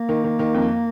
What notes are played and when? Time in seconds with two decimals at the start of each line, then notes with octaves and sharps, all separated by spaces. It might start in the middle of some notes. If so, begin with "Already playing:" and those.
Already playing: A#3
0.09 D#3
0.24 D#3
0.39 D#3
0.54 F2